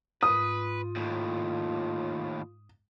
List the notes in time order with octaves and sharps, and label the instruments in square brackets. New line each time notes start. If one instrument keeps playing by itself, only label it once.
[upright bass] G#2 [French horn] F4 [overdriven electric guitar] B4 [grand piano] D#6
[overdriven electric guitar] D#2 A2